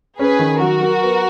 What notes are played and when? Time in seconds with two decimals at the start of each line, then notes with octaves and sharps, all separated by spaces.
0.18 C#4 G#4 B4
0.39 D#3
0.60 F#3 F#4 A#4
0.81 F#3
1.02 B3